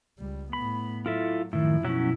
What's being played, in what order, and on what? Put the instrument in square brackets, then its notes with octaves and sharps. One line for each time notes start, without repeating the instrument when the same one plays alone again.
[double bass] C#2 G3
[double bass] A2 B3 [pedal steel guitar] B5
[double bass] F#3 [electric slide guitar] E4 A4 E5 [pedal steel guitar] F4
[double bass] F#2 F3 [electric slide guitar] A2 D#3 [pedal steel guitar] E4
[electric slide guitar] B2 E4 [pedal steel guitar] F#3 C#4